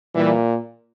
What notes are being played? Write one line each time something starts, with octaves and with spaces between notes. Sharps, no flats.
A#2 E3 G3